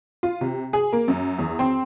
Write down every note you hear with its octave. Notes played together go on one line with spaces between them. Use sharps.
F4
C3
G#4
A#3
F#2
E2
C4